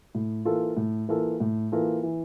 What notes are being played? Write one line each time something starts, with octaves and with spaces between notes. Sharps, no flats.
A2
E3 A#3 F4 A4
A2
E3 A#3 F4 A4
A2
E3 A#3 F4 A4
E3